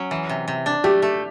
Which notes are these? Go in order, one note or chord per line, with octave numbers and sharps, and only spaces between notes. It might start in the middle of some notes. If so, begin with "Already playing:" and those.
Already playing: F#3 C#4
E3
C3
C3
D4
A3 G4
A3